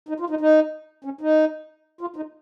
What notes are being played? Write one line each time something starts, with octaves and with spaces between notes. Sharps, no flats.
D#4
F4
D#4
D#4
C#4
D#4
F4
D#4